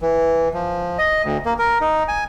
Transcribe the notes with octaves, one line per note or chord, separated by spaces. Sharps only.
E3
F3
D#5
D2
A#3
A#4
D#4
G#5